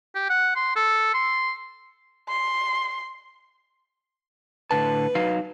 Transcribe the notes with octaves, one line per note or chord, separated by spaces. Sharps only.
G4
F#5
C6
A4
C6
C6
A2 D3 B4 A5
F#3 D#4 F5